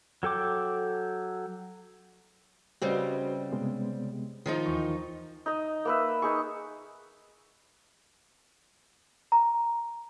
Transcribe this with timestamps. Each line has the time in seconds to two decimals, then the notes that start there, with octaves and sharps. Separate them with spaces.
0.23 F#3 A4 G5 D6
2.82 C#3 G3 C4 F#4 B4 D#5
3.52 C3 G#3 B3
4.46 D#3 F3 D#4
4.66 D#2 E3 C#6
5.46 D#4 D#5
5.85 A#3 B4 E5
6.22 D#4 G#4 C#6
9.32 A#5